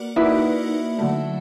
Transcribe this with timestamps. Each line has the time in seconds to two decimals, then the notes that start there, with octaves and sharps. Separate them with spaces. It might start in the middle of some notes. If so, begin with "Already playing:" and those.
Already playing: A#3 F#4 B4 D5
0.16 A#3 D#4 E4 F#4 B4 D5
0.99 D3 F#3 A3